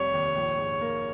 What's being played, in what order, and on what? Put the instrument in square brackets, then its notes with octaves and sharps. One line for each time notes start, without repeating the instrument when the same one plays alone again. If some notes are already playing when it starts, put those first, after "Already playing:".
Already playing: [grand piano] F1 C3 G3 [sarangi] C#5
[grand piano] D#2
A#1
G#2
A#3